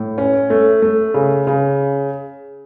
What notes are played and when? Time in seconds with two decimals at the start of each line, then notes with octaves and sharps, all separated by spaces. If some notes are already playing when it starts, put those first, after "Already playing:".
Already playing: A2
0.18 C#4
0.50 A3
0.82 A3
1.14 C#3
1.47 C#3